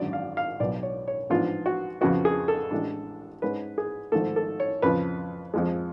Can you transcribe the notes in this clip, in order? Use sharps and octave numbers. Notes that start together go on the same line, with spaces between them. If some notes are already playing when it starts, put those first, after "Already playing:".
Already playing: G#1 F#2 D3 F#3 D5
F5
F5
B1 B2 F#3 D5
C#5
C#5
A1 G#2 F3 B3 D4 F4
F#4
F2 C#3 F3 B3 F#4
G#4
A4
A1 A2 G#3 D4
G#2 G#3 C#4 B4
G#4
G#1 G#2 F3 A3 A4
A4
C#5
F2 C#3 F3 B4
F2 F3 G#3